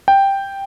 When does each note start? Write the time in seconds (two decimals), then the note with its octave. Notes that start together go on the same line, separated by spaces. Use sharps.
0.08 G5